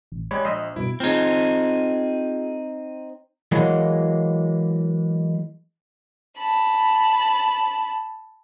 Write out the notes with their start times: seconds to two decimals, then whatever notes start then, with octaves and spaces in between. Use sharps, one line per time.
0.12 A1
0.31 G#3 G4 C#5 D5 B5
0.45 A#1 C5 D#5 E5
0.76 G2 B2 E4 D7
1.00 C4 D#4 F4 G#4
3.52 E3 F#3 G#3 A#3
6.37 A5 B5